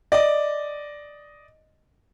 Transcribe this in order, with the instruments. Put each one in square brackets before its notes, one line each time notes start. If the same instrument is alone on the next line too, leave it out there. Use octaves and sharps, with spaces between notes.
[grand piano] D5 D#5